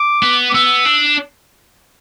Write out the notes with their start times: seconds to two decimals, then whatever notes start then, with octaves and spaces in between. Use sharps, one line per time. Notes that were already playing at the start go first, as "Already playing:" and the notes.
Already playing: D6
0.23 B3
0.49 D6
0.54 B3 E6
0.85 D4